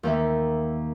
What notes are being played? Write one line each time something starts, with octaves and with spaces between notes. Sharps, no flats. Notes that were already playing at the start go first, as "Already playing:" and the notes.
D#2 A#3 E5